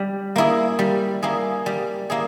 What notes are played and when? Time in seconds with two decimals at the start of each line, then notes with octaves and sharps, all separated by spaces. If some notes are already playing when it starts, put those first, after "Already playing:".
Already playing: G3
0.36 A#3 E4 G#4
0.79 G3
1.23 A#3 E4 G#4
1.66 G3
2.10 A#3 E4 G#4